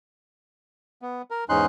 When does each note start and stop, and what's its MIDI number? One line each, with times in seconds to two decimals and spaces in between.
1.02 1.22 59
1.31 1.44 70
1.49 1.66 40
1.49 1.66 44
1.49 1.66 61
1.49 1.66 63
1.49 1.66 84
1.49 1.66 90